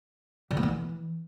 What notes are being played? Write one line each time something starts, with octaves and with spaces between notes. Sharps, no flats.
D3
B3
E3